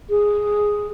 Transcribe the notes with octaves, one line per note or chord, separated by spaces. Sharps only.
G#4